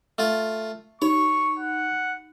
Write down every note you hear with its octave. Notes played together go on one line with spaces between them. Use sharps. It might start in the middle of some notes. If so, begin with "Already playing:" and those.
A3 F4
D#4 C#5 C#6
F#5